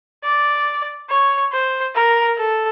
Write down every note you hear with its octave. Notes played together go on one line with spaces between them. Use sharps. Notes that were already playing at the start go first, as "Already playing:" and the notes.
D5
C#5
C5
A#4
A4